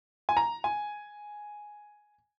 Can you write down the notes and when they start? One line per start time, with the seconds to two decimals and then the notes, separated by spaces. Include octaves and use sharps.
0.29 G#5
0.37 A#5
0.64 G#5